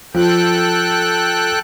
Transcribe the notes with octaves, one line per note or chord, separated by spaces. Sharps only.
F3 A4 G5 F#6